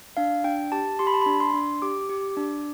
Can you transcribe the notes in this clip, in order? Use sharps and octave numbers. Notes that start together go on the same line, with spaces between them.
D4 F5
D4 G5
G4 A5
G4 C6
B5
A5
D4 B5
C6
D4
G4 D6
G4
D4